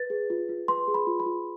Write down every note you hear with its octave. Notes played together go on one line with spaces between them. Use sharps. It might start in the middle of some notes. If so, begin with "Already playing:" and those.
Already playing: B4 A6
G#4
F4
F4
B4 C6
G#4
B5
F4
B5
F4